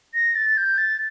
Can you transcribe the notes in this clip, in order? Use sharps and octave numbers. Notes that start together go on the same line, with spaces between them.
A#6
A6
G6
A6